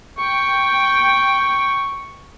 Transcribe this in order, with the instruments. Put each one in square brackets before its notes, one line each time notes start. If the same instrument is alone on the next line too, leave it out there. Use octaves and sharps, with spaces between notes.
[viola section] G5 [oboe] C#6